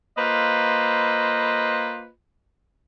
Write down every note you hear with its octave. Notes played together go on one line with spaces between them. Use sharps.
A#3 F4 B4 C5 D#5